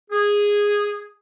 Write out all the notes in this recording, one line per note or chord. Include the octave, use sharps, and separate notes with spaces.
G#4